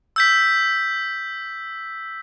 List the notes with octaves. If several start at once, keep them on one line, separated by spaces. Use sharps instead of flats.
E6 G6 B6